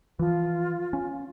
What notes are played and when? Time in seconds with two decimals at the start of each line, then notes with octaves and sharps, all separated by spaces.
0.19 E3 F3 F4
0.93 C#4